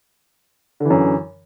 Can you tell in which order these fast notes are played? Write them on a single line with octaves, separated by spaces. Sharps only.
D3 E3 F#2